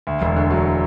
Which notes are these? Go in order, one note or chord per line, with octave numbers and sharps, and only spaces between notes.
D2
E1
D3
F#3